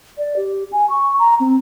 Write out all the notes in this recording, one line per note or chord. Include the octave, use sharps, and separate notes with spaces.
D5
G4
G#5
C#6
A#5
C4